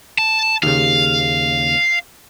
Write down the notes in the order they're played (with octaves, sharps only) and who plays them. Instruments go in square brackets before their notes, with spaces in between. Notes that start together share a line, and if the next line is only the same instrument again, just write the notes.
[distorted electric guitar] A5
[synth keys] D#2 C#3 [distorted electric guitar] F5